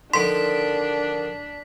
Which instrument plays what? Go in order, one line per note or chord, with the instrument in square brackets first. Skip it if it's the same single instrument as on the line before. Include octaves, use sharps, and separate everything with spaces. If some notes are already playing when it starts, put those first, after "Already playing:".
[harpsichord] D3 D#3 F3 [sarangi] D4 [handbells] C6 [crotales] B6